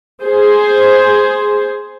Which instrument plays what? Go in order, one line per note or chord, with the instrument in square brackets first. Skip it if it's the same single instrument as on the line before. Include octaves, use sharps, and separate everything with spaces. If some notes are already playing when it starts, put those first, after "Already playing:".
[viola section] G#4 C5